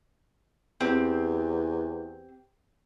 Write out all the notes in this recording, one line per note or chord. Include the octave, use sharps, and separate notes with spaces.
E2 C4 G4